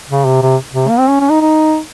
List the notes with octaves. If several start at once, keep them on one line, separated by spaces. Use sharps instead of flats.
C#3
C3
C3
C3
A#3
C4
C#4
C#4
D#4
D#4